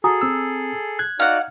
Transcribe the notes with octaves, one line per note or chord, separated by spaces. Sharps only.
F#4 G#4 A4 G#5 A#5 D#6
C4 E6
F#6 G#6
D#4 F#4 D5 F5 F#5